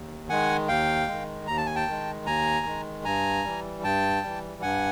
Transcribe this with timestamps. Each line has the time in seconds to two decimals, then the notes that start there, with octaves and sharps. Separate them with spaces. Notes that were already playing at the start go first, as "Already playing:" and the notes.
Already playing: D#2
0.29 D#3 G#3 F#5 G#5
0.68 D#2 F5 G5
1.08 D#3 G#3
1.47 D#2 A#5
1.57 A5
1.66 G#5
1.76 G5 A5
1.87 D#3 G#3
2.26 D#2 G#5 A#5
2.66 D#3 G#3
3.05 G2 G#5 A#5
3.44 E3 G3
3.83 G2 G5 A5
4.23 E3 G3
4.62 G2 F#5 G#5